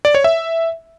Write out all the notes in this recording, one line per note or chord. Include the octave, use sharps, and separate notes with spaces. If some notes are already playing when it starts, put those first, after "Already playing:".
D5
C#5
E5